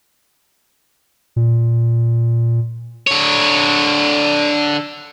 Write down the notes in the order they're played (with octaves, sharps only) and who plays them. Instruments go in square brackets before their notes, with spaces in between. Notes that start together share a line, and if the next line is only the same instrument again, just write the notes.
[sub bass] A#2
[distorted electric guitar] D3 C#5